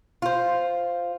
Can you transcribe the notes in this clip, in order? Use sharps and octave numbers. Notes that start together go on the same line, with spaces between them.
F4 C5